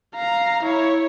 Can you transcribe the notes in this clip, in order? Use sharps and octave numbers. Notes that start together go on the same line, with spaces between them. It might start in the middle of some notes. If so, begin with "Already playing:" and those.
F5 A#5
E4 C#5